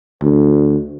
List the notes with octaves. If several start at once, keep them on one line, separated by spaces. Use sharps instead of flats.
D2